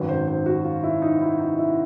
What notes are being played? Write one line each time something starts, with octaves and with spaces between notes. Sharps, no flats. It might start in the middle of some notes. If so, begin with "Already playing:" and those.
Already playing: G#1 F#2 D#3 B4
C5
C5
F#4
F4
E4
D#4
E4
D#4
E4